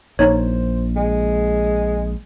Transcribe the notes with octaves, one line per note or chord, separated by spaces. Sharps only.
A#1 D#4 C5 C#5
G#3